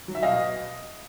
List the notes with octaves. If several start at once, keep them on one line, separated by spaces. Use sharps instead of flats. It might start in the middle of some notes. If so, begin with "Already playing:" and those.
F#3
E5
B2 D#5 F5